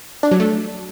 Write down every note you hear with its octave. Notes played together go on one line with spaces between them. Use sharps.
D4
F#3
A3